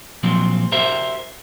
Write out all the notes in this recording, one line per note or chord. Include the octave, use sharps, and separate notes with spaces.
A#2 F3 F#3 C4
F#4 G4 A#4 C5 E5